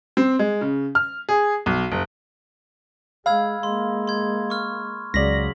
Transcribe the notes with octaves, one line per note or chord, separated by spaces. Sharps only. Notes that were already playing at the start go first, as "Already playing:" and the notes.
C4
G#3
C#3
F6
G#4
B1
F#1
G#3 F5 B5 E6 G#6
G#3 A#3 C6
C6 G#6
C#6 F6
C#2 C#3 F#3 D5 A#6 B6 F#7